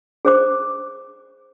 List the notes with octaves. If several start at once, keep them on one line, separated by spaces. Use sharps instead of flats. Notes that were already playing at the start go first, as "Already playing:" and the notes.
G#4 C5 D6